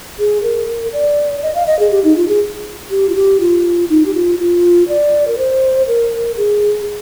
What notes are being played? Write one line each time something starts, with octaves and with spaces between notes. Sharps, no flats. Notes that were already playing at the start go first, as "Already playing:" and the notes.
G#4
A#4
D5
D#5
F5
D#5
G#4
G4
D#4
F4
G#4
G4
F4
G4
F4
D#4
G4
F4
F4
D5
A#4
C5
A#4
G#4